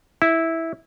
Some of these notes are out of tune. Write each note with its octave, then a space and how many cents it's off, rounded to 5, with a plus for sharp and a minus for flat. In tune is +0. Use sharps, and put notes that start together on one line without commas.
E4 -10